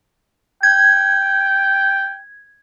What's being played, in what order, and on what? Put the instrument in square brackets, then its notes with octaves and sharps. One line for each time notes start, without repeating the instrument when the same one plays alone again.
[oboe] G5 [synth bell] G#6